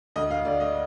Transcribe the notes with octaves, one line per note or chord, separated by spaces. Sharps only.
D2 D#5
F5
D2 D5
D#5